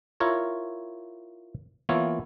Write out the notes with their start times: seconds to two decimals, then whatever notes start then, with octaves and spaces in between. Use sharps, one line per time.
0.20 E4 F4 A#4 C#5
1.89 E3 A#3 B3 E4 F4 C#5